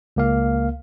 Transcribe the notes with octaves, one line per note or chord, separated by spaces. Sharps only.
C#2 A#3 F5